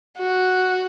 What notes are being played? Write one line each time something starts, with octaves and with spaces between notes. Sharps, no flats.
F#4